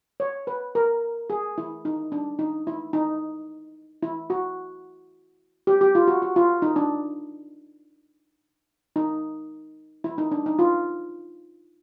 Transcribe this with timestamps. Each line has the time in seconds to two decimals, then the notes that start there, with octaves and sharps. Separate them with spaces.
0.20 C#5
0.47 B4
0.75 A#4
1.30 G#4
1.58 E4
1.85 D#4
2.12 D4
2.39 D#4
2.67 E4
2.93 D#4
4.03 E4
4.30 F#4
5.67 G4
5.81 G4
5.95 F4
6.08 F#4
6.22 F#4
6.36 F4
6.62 D#4
6.76 D4
8.96 D#4
10.04 E4
10.18 D#4
10.31 D4
10.46 D#4
10.59 F4